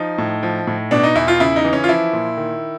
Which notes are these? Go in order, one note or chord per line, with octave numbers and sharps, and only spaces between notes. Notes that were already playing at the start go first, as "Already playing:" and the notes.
Already playing: F3 D#4
A2
F3
A2
B2 D4
D#4
E2 E4
F4
C#3 E4
D#4
E3
C#4
F4
F3 E4
A#2
D#3